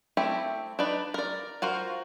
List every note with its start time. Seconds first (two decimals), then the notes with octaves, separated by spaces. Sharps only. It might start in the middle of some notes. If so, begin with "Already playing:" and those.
0.17 A3 C4 E4 G4
0.79 D4 D#4 B4 D5
1.14 A#4 D5
1.62 F4 F#4 A#4 C5